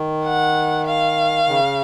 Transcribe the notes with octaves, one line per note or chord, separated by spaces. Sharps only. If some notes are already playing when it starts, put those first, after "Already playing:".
Already playing: D#3
F#5
F5
C#3